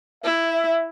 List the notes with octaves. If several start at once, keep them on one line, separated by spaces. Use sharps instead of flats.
E4 E5